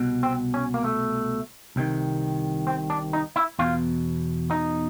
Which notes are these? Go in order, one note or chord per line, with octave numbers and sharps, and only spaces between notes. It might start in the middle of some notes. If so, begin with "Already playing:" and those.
Already playing: C2 B2
C4
C#4
A#3
A3
C2 C3 D#3
C4
D4
D#4
E4
E2 B2 F4
D#4